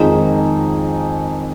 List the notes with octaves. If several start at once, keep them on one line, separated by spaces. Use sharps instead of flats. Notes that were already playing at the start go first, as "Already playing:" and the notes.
Already playing: F2 D#3 G#3 D#4 G#4